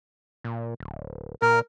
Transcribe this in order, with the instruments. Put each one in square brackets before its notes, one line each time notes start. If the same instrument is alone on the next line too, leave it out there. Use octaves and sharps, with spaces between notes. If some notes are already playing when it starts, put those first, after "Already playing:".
[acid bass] A#2
D1
[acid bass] A#2 [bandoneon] A#4